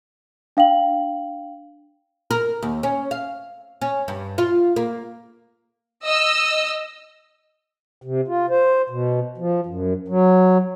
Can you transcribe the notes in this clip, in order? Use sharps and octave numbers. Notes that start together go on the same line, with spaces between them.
D4 F5 G5 F#7
A#4
D#2
C#4
F5
C#4
G2
F4
A#3
D#5 E6
C3
F4
C5
B2
F3
F#2
F#3